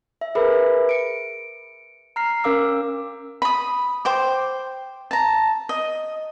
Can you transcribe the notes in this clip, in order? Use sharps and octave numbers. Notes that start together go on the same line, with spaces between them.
E5
G#4 A#4 B4 E5 B5
C#7 D7
A#5 F6 C7
C#4 A#4 F5 D6 E6
B5 D#6
C5 G5 D6
A5 A#5
D#5